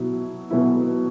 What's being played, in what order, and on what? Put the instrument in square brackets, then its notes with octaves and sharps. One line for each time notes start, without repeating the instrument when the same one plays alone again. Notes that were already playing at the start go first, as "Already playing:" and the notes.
Already playing: [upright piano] B2 F#3 B3 E4
B2 F#3 B3 E4